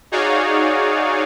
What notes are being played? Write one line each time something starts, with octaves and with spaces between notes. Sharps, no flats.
D#4 F#4 G#4 C#5 D5 F5